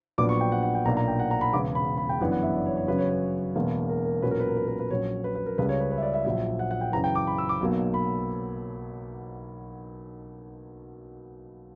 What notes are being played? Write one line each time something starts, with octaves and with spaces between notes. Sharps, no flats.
A#1 A#2 F#3 B3 D4 D6
C#6
G5
F#5
F#5
G5
B1 A#2 A#3 D4 A#5
A#5
G5
F#5
A#5
B5
E1 E2 C#3 D6
B5
B5
G5
G1 F#2 E3 B3 D4 F#5
F#5
E5
D5
C#5
C#5
F#2 C#3 F#3 C#4 B4
C#5
B4
E1 E2 B2 A#3
A#4
A#4
B1 A#2 F#3 C#4 B4
A#4
B4
A#4
B4
A#4
B4
A#1 A#2 F#3 C#4 C#5
B4
B4
A#4
C#2 C#3 G3 C#4 B4
C#5
B4
B4
E5
D5
E5
A#1 A#2 F#3 E5
F#5
F#5
G5
F#2 C#3 E3 A#5
G5
D6
B5
E6
D6
B1 B2 F#3 A#3
B5